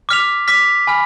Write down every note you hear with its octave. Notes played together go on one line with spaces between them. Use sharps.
D6 F6 B6 F7
D6 F6 B6
G#5 B5 F6